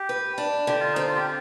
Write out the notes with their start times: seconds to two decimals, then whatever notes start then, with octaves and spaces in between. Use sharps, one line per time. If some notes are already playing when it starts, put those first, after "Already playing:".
Already playing: G4
0.09 B4
0.38 D4
0.67 D3 G4
0.80 F4
0.93 C4 D#4
1.05 F4
1.16 G4